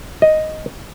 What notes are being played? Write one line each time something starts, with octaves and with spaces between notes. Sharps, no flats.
D#5